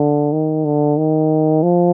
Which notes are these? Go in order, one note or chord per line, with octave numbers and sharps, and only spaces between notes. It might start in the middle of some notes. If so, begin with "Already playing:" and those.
Already playing: D3
D#3
D3
D#3
F3